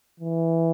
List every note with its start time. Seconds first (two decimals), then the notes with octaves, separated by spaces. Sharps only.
0.20 E3